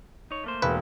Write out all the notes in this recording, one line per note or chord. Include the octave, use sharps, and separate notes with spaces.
D#4 C#5
A3 A#3 C5
E1 B4